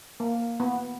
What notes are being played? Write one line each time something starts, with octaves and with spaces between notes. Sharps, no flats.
A#3
B3